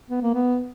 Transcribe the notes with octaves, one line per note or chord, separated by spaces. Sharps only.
B3
A#3
B3